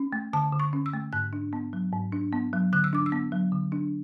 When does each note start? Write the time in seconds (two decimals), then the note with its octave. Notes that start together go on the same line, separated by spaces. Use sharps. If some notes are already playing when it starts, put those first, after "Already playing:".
Already playing: C#4
0.13 A3
0.33 D3 A5
0.53 D3
0.60 C#6
0.73 C#4
0.86 E6
0.93 A3
1.13 G#2 F#6
1.33 D4
1.53 B3
1.73 F#3
1.92 G#2
2.12 D4
2.33 B3
2.53 F#3
2.73 D3 F#6
2.84 E6
2.93 D4 D6
3.06 E6
3.12 B3
3.32 F#3
3.52 D3
3.72 D4